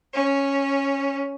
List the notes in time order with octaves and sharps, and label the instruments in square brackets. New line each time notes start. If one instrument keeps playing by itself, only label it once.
[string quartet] C#4